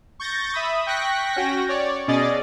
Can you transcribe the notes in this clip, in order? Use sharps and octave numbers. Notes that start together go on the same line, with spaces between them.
C#6 G6 A6 A#6
E5 B5 D#6
G5 C#6 F#6 A#6 B6
C#4 F#4 G5 A#6
C#5 D5
B2 C#4 G#4 D5 D#5 A6